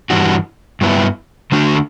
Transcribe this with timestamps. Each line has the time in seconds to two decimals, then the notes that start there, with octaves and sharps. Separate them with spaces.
0.10 G2 E3 G3 D4 F#4
0.81 G2 F#3 B3 E4
1.52 D3 A3 D4 F#4